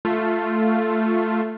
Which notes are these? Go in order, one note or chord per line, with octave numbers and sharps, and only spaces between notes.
A3 F4